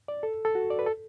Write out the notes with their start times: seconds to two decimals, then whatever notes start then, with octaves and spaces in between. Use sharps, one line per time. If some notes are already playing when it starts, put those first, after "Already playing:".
0.08 D5
0.23 A4
0.45 A4
0.55 F#4
0.70 D5
0.79 B4
0.86 A4